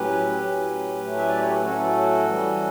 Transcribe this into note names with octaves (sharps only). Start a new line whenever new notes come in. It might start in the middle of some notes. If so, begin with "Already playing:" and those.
Already playing: A2 F#3 C#4 G4 B4
A2 F#3 C#4
A2 F#3 A3 C#4
E5
D5
C#5
B4
A2 F#3 A3 C#4 F#4 A4
E3 G3 C#4